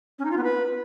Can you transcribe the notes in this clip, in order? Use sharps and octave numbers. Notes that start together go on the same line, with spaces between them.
C#4
D#4
F4
B3
B4